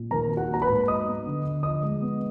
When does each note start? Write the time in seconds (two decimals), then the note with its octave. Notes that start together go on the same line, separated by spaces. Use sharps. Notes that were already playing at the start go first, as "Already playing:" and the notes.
Already playing: A#2
0.11 D#3 A#4 A#5
0.30 F#3
0.37 F#4 F#5
0.50 A#3 A#5
0.62 B4 B5
0.68 G#2
0.88 F#3 D#5 D#6
1.06 B3
1.26 D3
1.45 D3
1.63 F3 D#5 D#6
1.83 G#3
2.02 B3